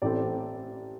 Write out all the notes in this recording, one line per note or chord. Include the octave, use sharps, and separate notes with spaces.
A1 A2 A3 C4 D5